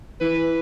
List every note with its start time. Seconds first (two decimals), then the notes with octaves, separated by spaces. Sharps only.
0.21 E3 B4